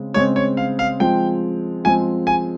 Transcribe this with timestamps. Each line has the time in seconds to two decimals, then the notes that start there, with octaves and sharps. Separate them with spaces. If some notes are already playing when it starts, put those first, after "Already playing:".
Already playing: C#3 G#3 C4
0.14 C#3 G#3 C4 C#5
0.36 C#5
0.57 F5
0.79 F5
1.00 F3 G#3 C4 G5
1.84 F3 G#3 C4 G#5
2.27 G#5